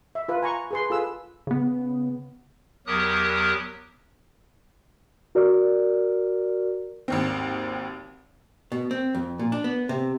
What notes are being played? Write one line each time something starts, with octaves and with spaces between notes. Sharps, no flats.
E5
F4 B4
G#5 A#5 C#6
G#4 B4 C6
F4 G#4 A4 B4 E6
C#3 B3
E2 F#3 G4 A#4 D#6 F#6
F#4 A#4 D5
G#1 D#2 C4
B2
C4
F2
A#2
D4
B3
C3